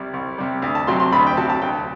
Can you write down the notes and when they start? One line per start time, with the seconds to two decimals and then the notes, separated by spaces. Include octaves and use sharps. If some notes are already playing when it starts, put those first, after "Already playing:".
Already playing: C2 C3 G3
0.13 C2
0.38 C3 G3
0.62 D2
0.75 A5
0.87 C3 F#3 C4 C6
1.00 C6
1.12 D2 B5
1.27 G5
1.37 C3 F#3 C4 A5
1.50 A5
1.62 D2 G5